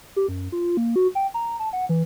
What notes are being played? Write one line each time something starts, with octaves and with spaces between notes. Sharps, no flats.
G4
F#2
F4
A#3
F#4
G5
A#5
A5
F#5
E3